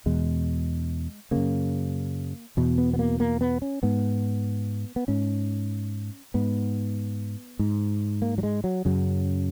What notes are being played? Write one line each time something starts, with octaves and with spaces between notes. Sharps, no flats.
E2 B2 G#3
F#2 C#3 A#3
E2 B2
B3
B3
A#3
A#3
B3
C#4
G#2 B3
B3
G#2 C#4
G#2 B3
G#2
A#3
F#3
G#3
F#3
F#2 C#3 F#3